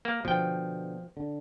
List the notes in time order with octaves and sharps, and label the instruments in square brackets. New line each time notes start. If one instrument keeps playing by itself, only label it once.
[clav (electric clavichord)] A#3
[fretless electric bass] B2 D3 [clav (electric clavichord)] F3 G5
[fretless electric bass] D3